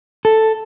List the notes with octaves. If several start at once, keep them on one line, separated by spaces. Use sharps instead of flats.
A4